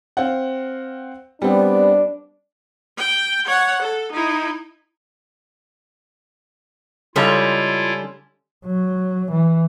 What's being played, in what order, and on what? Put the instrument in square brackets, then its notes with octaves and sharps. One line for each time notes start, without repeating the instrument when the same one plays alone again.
[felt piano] C4 F5 F#5
[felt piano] G3 C4 [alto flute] B3 [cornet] D4
[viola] G5
C#5 F#5
A4
D#4 E4
[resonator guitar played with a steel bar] C#3 G3 C#4 [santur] G#3 A4 [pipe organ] E4 F4
[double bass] F#3
E3